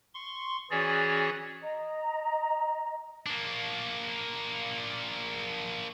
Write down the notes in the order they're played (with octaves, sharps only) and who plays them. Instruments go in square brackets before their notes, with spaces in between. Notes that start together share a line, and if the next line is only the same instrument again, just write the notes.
[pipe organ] C6 C#6
E3 C#4 F#4 G#4 C#5 D5
[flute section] D#5 A#5
[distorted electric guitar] A#3 D4